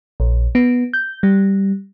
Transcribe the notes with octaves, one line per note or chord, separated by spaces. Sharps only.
A#1
B3
G6
G3